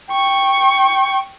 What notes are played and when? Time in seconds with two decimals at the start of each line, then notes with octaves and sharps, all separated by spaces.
0.10 G5 C#6